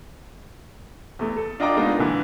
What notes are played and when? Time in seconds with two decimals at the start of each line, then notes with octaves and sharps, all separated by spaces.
1.19 E2 A3
1.37 A4
1.60 D4 F4 D#5 G5 A#5 D6
1.77 G#3 A#3 B3 D4 D#4 F4
1.98 A#2 D3 E3